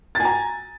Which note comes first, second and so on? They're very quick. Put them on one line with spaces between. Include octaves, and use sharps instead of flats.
A6 G#5 A#5